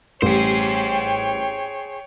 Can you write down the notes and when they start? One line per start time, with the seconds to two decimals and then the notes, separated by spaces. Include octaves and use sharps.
0.22 A1 G3 G#4 C5 C#5 G5